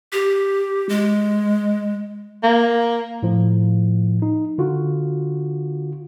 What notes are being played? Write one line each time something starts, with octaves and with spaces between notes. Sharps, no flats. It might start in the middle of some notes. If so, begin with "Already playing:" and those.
G4
G#3
A#3
A2 F3
D#4
D3 F4 F#4